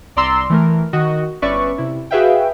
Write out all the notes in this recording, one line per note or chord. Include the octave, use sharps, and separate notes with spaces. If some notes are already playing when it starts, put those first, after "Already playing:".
C2 D5 A#5 C6 E6
E3 A3 A#4
D#3 F#4 D#5
G1 C#4 B4 D5 E5 C#6
C3 E4
F#4 G#4 B4 E5 F5 G5